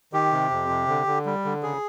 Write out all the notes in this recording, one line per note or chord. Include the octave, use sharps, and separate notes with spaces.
D#3 G4
C3
F2
C3
D3
D3
G3
D3
C#3 G#4